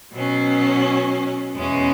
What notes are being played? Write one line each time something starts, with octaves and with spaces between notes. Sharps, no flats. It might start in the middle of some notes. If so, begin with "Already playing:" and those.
B2 F#3 C#4
E2 B2 G#3 C#4